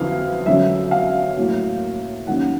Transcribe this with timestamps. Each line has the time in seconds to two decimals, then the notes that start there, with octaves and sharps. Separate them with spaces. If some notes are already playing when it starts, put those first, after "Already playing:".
Already playing: F2 D3 F#3 B3 E4 F5
0.46 F#2 D3 F#3 E5
0.91 F5
1.37 A2 F#3 A#3
2.27 D#3 F#3 A#3 C#4 F#5